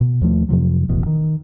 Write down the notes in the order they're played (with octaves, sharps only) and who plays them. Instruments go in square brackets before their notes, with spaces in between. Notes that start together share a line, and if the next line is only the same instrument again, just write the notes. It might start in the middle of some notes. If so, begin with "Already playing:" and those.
[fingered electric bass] B2
D#2 F3 A3
F2 C3 F3 F#3
D1 A1 E2 B2
D#3